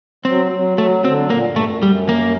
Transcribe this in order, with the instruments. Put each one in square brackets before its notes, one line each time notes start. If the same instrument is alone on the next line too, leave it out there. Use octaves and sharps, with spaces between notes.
[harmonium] F#3 [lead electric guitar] C4
[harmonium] F#3
[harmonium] F#3 [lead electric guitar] A3
[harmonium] D3 [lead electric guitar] C4
[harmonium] A#2 [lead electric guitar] A#3
[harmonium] G2
[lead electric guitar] A3
[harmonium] F#2
[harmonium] F#2 [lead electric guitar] G3
[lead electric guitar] A#3